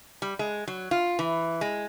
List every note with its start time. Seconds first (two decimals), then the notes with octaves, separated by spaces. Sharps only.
0.22 G3
0.39 G#3
0.68 F#3
0.91 F4
1.19 E3
1.61 G#3